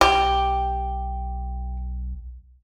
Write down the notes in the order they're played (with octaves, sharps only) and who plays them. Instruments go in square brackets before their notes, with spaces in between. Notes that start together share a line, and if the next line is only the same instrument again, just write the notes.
[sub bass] B1 [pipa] G4